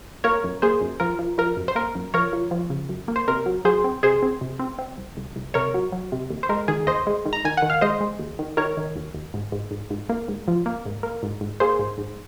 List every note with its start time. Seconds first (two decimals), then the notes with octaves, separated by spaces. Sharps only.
0.24 A#3 A#4 C#5
0.44 F#2
0.62 A#3 G#4 C5
0.81 F#2
1.00 F3 A#4
1.19 F3
1.38 F3 A#4
1.57 F#2
1.68 C5
1.75 A#3 A#4
1.95 F#2
2.14 F3 A#4 C#5
2.33 F3
2.51 F3
2.70 C#3
2.89 F#2
3.08 A#3
3.16 C5
3.28 C3 A#4
3.46 F#3
3.65 F#3 G#4 C5
3.84 C4
4.03 C3 G#4 C5
4.23 C4
4.41 C3
4.59 C4
4.79 C4
4.98 C2
5.17 C2
5.36 C2
5.54 C3 A#4 C#5
5.74 F#3
5.92 F#3
6.12 C3
6.30 D#2
6.43 C5
6.49 G#3 A#4
6.68 D#3 G#4
6.87 D#2 C5 D#5
7.07 G#3
7.26 D#3
7.33 A#5
7.45 D#3 G#5
7.57 D#3 F#5
7.70 F5
7.81 G#3 C5 D#5
8.01 G#3
8.19 D#2
8.39 D#3
8.57 D#3 A#4 C#5
8.77 D#3
8.96 D#2
9.14 D#2
9.34 G#2
9.52 G#2
9.71 G#2
9.90 G#2
10.09 A#3
10.28 G#2
10.48 F3
10.66 A#3
10.86 G#2
11.03 A#3
11.23 G#2
11.41 G#2
11.60 A#3 G#4 C5
11.79 G#2
11.98 G#2